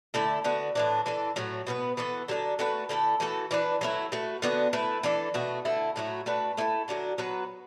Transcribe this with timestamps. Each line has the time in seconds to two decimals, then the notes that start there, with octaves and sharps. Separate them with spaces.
0.14 D3 A3 E4 A4
0.44 D3 B3 F#4
0.75 A2 E3 D4
1.06 E3 D4 A4
1.36 A2 F#3 A3 F#4
1.67 B2 B3 F#4 B4
1.97 E3 B3 F#4 A4
2.28 D3 F#3 D4 A4
2.59 A3 D4 F#4 B4
2.89 D3 A3 E4 A4
3.20 E3 A3 F#4 A4
3.51 E3 D4 B4
3.81 F#3 A3 E4
4.12 A3 F#4 B4
4.42 D3 B3 D4 F#4
4.73 A3 E4 B4
5.03 E3 D4 A4
5.34 B2 A3 F#4
5.65 D3 A3 E4
5.96 A2 F#3 A3 F#4
6.26 A3 D4 F#4 B4
6.57 A3 E4 A4
6.88 D3 F#3 D4 F#4
7.18 F#3 B3 F#4 B4